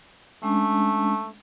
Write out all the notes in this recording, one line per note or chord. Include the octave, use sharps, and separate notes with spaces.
G#3 A3 C#4 D4